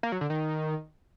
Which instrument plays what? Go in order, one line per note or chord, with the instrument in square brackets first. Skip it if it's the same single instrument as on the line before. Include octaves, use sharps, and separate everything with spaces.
[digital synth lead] A#3
F#3
D3
D#3